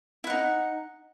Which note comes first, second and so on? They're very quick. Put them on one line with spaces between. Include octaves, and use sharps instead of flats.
E4 F#5 D#4